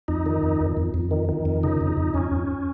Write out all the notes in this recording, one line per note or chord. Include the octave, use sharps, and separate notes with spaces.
F2 D#4
D#3
F2
F2
F2
F2
D#3
D#3
F2
C#3 D#4
F2
F2
F2 C#4
F2